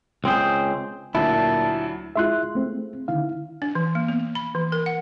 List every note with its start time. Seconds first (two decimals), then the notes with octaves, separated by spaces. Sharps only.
0.24 C#2 C4 G#4 C5
1.15 D2 A#2 F#3 D4 E4 A5
2.16 G#3 E4 F4 E5 C6 F#6
2.55 A3 C4
3.08 D3 D#3 E4 F5
3.62 D4
3.75 E3
3.95 A#3
4.08 B3
4.35 B5
4.55 E3
4.72 A#4
4.86 F#5